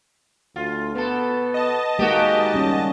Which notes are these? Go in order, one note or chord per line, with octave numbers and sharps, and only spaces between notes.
D2 F4
B2 B3 A4
D#5 A5
D#3 G#3 A#3 F#4 G4
G3 C#4